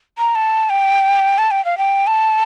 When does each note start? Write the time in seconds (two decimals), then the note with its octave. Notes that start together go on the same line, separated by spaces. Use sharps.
0.18 A#5
0.35 A5
0.70 G5
1.38 A5
1.51 G5
1.65 F5
1.78 G5
2.07 A5